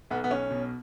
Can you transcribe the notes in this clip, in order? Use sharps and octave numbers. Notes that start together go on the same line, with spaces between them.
B1 B3
B3
B1 C#4
B2